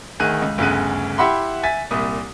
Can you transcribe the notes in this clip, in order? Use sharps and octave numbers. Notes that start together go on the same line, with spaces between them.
D2 D#3 G#4 F#6 D#7
C#2
G1 D2 C#3 G#4 F#6 D#7
E4 G4 E5 F#5 B5 C6
E5 G#5 A6 B6
C2 A#2 D#6